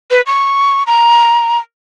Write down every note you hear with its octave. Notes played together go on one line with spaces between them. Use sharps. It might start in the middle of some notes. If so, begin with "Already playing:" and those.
B4
C#6
A#5